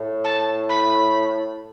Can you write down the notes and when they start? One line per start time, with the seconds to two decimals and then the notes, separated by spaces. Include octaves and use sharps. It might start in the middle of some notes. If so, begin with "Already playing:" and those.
Already playing: A2
0.24 A5
0.69 B5